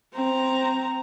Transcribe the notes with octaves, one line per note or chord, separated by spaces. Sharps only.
C4 A#5